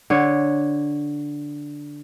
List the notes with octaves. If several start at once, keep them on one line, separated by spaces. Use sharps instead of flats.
D3 C#5